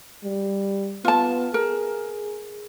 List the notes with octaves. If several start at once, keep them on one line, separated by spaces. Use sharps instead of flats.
G3
B3 F4 A5
G#4 A#4